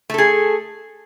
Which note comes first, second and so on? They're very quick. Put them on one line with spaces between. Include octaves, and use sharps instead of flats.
A3 A4 G#4